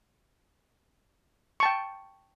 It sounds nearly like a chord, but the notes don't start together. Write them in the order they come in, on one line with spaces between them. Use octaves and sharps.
C#6 A5 G5